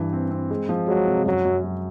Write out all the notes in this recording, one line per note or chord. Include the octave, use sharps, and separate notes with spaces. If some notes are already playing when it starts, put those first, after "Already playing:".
Already playing: G2 E3
C4
C4
G#3
F3
F#3 G#3
C3
F#2 F#3
F#2
F#3